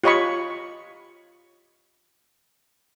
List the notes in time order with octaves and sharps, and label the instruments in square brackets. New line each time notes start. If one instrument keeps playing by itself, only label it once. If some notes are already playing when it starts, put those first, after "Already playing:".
[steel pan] F4 G4 C#5 D#5 B5 C#6